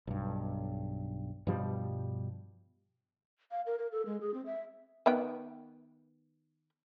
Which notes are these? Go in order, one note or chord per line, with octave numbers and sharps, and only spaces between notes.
B1 G2
G2 B2 F3 G3
F5
A#4
A#4
A4
G#3
G#4
C4
E5
D#3 B3 G5